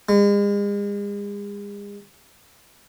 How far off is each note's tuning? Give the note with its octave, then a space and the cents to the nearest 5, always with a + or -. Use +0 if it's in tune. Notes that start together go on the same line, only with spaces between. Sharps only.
G#3 -40